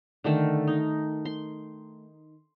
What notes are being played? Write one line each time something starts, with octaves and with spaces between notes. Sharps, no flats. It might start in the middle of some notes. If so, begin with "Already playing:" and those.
D3 D#3 A3
D#4
C6